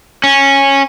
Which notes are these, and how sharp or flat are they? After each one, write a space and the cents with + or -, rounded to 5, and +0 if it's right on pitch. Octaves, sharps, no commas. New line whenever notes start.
C#4 -10